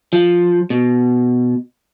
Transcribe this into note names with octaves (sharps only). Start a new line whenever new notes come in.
F3
B2